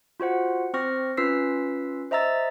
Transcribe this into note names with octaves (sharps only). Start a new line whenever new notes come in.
F4 F#4 C5 F#5
C4 C5 C#6 F6 A#6
C#4 F4 B4 E6 B6 C7
C5 D#5 E5 A#5 E6 A6